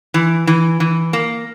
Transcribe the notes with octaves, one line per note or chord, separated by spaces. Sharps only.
E3
E3
E3
A#3